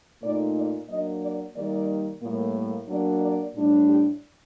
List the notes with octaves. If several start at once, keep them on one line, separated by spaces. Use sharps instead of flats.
A#2 A3 D#4 D5
D5
F#3 A#3 D4 D#5
D5
D#3 G3 A#3 D5
A2 G3 A#3
F#3 A#3 D4 D5
D5
A2 G3 D4
G4